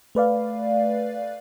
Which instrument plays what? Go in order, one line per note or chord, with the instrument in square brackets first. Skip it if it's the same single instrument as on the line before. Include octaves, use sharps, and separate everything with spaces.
[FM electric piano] A3 B4 D5 F5